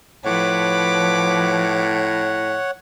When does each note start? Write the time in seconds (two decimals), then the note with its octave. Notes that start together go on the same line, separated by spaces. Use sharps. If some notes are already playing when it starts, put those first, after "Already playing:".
0.25 A2 F3 B4 C#5 F#5 D6